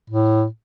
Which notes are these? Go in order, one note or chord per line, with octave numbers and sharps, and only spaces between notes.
A2